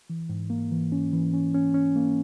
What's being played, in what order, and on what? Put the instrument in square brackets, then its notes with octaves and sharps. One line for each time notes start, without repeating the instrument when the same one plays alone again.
[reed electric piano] E3
G#2
A#3
E3
C#4
E3
C#4
C#4
C#4
A#3